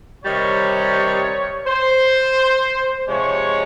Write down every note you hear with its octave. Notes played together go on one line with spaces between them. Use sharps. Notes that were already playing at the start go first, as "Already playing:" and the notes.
C3 D#3 G3 C#5
C5
C3 F3 G#3 C#5